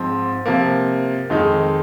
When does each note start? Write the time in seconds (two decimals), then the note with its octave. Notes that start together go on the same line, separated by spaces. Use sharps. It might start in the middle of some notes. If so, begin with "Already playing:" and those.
Already playing: G#2 F3 C4
0.46 C3 F3 A#3
1.30 F2 D#3 G#3 D#4